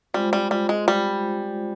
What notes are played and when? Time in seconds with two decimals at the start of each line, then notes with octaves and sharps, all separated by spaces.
0.14 G3 G#3 C4 F4 C5
0.33 G3
0.51 G3
0.69 G#3
0.88 G3